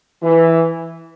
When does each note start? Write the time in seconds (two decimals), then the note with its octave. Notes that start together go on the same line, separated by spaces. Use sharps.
0.22 E3